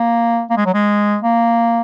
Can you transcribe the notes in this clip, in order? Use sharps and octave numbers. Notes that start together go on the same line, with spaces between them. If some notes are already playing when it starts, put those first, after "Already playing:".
Already playing: A#3
A#3
G#3
F#3
G#3
A#3